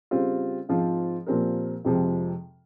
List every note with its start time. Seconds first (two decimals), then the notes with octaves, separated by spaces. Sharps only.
0.11 C#3 G3 C4 F4
0.69 G#2 F3 C4 F4
1.26 A#2 F3 C4 G4 A#4
1.85 F2 C3 F3 G#3